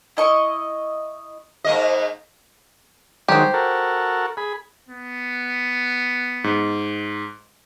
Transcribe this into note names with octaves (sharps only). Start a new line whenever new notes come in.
E4 D#5 C#6
G#2 A#3 D#5
D#3 F#3 G#3 G4 C5
F#4 A4 A#4
G#4 B5
B3
G#2